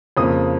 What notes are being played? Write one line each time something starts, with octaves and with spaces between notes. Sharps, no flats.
F2 C#3 A#3 D#6